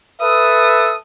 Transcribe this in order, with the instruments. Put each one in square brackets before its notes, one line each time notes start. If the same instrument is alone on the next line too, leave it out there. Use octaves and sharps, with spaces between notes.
[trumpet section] A4 B4 E5 [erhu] D#6